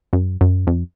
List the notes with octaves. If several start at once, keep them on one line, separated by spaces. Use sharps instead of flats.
F#2
F#2
F2